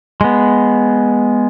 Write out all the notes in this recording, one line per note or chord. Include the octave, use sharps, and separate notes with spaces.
G#3 B3